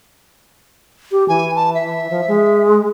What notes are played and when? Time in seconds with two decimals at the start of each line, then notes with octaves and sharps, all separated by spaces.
1.12 G4
1.29 E3 G#5
1.56 A5
1.75 E5
2.10 F3
2.28 G#3